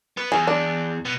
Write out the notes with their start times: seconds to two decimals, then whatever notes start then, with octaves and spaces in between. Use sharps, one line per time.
0.17 B3 B4
0.32 E2 G#4
0.47 D4
1.05 B2 B3